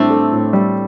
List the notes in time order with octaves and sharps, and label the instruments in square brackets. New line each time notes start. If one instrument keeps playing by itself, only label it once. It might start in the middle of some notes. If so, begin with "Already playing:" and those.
Already playing: [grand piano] A2 G3 E4 [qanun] A3 C4 D4
[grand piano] A4
A2
G3